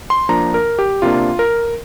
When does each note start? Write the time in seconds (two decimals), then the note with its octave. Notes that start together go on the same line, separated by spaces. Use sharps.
0.10 C6
0.29 F3 A#3 D4 A#5
0.54 A#4
0.79 G4
1.02 C3 A#3 D4 F4
1.39 A#4